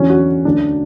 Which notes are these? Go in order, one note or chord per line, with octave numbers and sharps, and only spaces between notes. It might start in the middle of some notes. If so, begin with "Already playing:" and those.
Already playing: E2 D3 F#3 C#4
F#4
D2 D3 F#3 D4